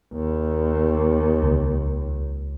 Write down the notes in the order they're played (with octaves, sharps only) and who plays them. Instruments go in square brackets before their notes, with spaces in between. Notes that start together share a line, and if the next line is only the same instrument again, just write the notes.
[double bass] D#2
[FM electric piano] C#2